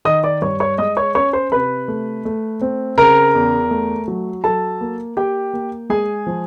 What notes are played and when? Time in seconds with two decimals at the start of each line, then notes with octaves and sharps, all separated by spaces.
0.05 D#3 D#5 D#6
0.24 D5 D6
0.42 G2 C#5 C#6
0.60 C#5 C#6
0.78 G#3 D#5 D#6
0.97 C#5 C#6
1.15 C#4 C#5 C#6
1.33 C5 C6
1.52 C3 B4 B5
1.88 A3
2.25 A3
2.61 C4
2.98 C#3 A#4 A#5
3.35 E2
3.71 A3
4.08 F#3
4.44 F#3 A4 A5
4.81 A#3
5.17 A#3 G4 G5
5.53 A#3
5.89 G#3 G#4 G#5
6.27 F3